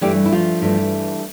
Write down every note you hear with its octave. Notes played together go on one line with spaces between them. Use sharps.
G2 E3 G3 A3 G4
E4
F3 F4
G2 E3 A3